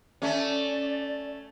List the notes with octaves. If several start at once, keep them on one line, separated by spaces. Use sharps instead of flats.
A3 C#4 D5